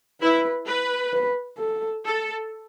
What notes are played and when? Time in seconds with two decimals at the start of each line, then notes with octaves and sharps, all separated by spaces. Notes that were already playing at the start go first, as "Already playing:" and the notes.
0.21 E4 B4
0.67 B4
1.13 B4
1.58 A4
2.05 A4